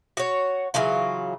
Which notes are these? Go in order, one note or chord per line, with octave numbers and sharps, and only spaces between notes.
F#4 C#5
C#3 E3 F#3 F4